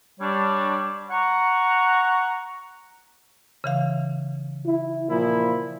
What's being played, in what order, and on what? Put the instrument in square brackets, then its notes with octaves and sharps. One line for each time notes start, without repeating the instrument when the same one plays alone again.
[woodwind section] G3 D4 C#5
F#5 A#5 C#6
[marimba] C#3 E3 F5
[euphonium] E4
[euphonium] A#2 [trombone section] F3 E4